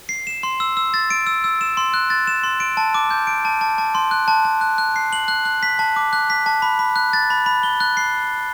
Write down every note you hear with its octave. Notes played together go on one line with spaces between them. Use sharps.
C7
E7
C6
E6
E6
A6
D7
E6
E6
E7
C6
F#6
A6
E7
C6
D7
A5
D6
G6
D7
A5
A5
A5
C6
F#6
A5
A5
F#6
F#6
C7
F#7
F#6
F#6
B6
A5
D6
F#6
B6
A5
B5
B5
F#6
A6
B5
B5
G7
F#6
C7